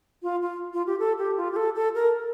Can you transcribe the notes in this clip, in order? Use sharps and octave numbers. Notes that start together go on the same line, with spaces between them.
F4
F4
F4
G4
A4
G4
F4
G4
A4
A4
A#4